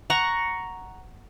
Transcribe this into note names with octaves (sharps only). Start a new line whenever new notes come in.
F#5 A#5 C#6